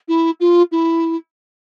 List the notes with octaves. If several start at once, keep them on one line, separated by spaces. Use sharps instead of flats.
E4
F4
E4